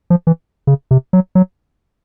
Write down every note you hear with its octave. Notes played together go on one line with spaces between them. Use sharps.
F3
E3
C#3
C3
F#3
F#3